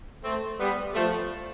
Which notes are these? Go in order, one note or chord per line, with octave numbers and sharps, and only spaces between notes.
A3 C4
G3 B3
F3 A3